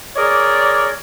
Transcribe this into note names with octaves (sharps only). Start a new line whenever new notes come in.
G#4 A#4 C#5 D5